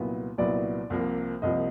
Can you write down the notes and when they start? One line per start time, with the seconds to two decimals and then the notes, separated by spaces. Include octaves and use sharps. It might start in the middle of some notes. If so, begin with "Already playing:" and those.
Already playing: C2 A#2 F#3 B3 E4
0.38 C2 A#2 F#3 B3 E4 D5
0.90 C2 C3 F3 A#3
1.42 C2 C3 F3 A#3 D#5